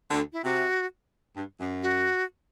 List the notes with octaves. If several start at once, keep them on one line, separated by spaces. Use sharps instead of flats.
D2 D3
E4
C3 F#4
G2
F#2
F#4